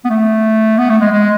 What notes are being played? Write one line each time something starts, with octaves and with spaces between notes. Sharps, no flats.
B3
A3
B3
A3
G#3
G#3